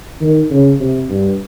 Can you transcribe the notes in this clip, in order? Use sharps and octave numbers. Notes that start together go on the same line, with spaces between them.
D#3
C#3
C3
G2